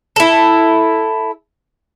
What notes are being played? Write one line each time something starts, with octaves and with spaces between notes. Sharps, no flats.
E4 A4